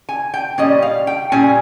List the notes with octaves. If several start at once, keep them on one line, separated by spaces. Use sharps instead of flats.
G#5
G5
A#2 G3 C#4 D#5
F5
G5
A#2 G3 C#4 G#5